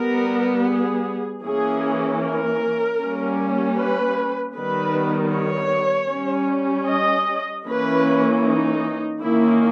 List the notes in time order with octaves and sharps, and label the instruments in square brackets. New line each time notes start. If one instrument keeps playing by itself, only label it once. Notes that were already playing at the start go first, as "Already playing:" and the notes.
Already playing: [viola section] G3 B3 A#4
G#4
E3 A#3 C#4 G#4
A#4
G3 A#3 C#4
B4
D#3 G3 B3 B4
C#5
G3 C#4
D#5
E3 A#3 C#4 B4
D#4
D#3 A#3 C#4 E4